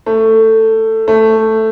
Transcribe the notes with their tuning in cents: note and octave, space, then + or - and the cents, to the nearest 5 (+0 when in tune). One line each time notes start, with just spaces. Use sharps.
A3 +15
A3 +5